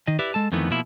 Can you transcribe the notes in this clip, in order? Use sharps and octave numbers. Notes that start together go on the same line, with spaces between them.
D#3 D#5
E4 G4 B4 D5 E5
G#3 A4 A5
F2 D#3 E3 A3 B3
B2 F3 A#3 E4